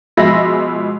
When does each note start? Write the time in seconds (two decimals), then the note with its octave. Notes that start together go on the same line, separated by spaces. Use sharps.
0.17 B2 F3 G#3 E5 B5 A#6